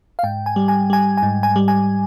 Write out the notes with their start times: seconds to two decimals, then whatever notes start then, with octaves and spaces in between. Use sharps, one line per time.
0.19 F5
0.23 G#2 G5
0.46 G#5
0.56 G3
0.68 G#5
0.90 G3 G#5
1.17 G#5
1.23 G#2
1.43 G#5
1.56 G3
1.68 G#5